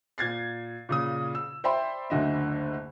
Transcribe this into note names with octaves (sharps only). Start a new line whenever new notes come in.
A#2 G#6 A6 C7
A#2 C#3 D#6
E6
C5 D5 E5 G5 B5 C6
F#1 D2 D3 D#5 E5